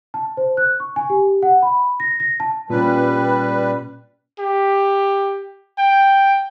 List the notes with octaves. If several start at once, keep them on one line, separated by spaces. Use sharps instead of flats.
A5
C5
F#6
C#6
G#5
G4
F#5
B5
A#6
A#6
A5
A#2 G3 C#4 B4
G4
G5